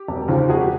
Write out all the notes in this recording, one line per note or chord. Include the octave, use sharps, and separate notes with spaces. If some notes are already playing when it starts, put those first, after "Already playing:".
Already playing: G4
E1
D#2 C#3 F3
E1 F#4 G#4
G4